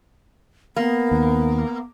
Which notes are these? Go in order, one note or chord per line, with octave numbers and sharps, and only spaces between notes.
A#3 B3
D#2